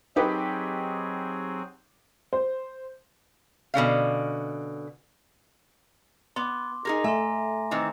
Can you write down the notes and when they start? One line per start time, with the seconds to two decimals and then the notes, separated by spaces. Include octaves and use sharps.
0.16 F#3 C4 D#4 G4 G#4 B4
2.33 C5
3.74 B2 D3 C#4 F5
6.36 B3 C6 D6
6.85 D#4 G#4 A#4 A#6
7.04 A3 E5 G#5 A#5 C6
7.71 D#3 E3 C4